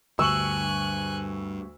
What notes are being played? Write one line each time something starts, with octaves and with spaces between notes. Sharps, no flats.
D2 G2 G#5 C#6 E6 F#6 F#7